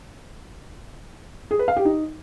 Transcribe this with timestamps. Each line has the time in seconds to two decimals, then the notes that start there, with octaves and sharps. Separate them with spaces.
1.51 G#4
1.59 B4
1.68 F5
1.77 G4
1.85 D#4